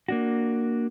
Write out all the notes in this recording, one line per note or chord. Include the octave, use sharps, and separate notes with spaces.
A#3 D4 F#4